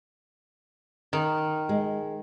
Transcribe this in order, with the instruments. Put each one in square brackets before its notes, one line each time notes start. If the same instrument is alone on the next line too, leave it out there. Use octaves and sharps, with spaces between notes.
[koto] D#3
[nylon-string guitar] G#3